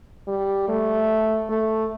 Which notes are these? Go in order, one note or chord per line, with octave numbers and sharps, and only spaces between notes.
G3
A3
A3